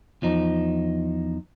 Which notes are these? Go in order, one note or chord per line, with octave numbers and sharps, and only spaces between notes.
E2 F3 D#4